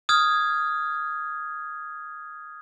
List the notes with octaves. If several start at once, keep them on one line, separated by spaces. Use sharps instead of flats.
D#6 F6 G#6